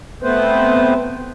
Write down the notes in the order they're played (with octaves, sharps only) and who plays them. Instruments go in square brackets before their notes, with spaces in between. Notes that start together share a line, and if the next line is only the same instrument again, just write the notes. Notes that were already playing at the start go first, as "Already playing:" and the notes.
[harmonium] A3 B3 C4 B4 C5